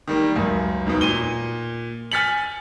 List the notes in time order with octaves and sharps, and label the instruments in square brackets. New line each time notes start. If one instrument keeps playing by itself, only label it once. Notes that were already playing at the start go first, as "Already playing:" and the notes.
[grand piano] D#3 G3 A#3
C#2 F#2
D#2 G#2 B2
A#2 D#7 G7
G#5 F6 A6 B6 C#7 F#7